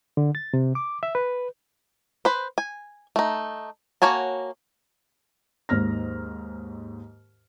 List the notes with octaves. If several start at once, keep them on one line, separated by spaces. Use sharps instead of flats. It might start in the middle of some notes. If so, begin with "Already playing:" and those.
D3
A6
C3
D6
E5
B4
B4 C5
G#5
A3 D#4
A#3 F#4 C#5 G#5 A5
D#2 G#2 F6 A#6